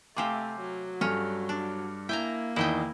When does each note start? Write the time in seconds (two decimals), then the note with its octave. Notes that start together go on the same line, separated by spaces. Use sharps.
0.17 C3 A3 C4 G4 F5 G#5 D6
0.60 F#3
1.01 G2 C#4 A4 F6
1.49 D4
2.09 A#3 E4 G5 G#5 A#5
2.56 E2 D#3 E4 D#5 G5